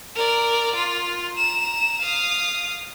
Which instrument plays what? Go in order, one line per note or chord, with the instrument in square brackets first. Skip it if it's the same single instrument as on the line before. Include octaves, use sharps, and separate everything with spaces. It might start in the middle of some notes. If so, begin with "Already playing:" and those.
[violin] A#4 D5
F4
A#5 E7
F5 D#6